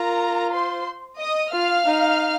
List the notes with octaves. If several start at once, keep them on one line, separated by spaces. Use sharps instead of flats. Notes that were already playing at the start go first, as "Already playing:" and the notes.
Already playing: F4 A#4 A#5
C5 C6
D#5 D#6
F4 F5 F6
D#4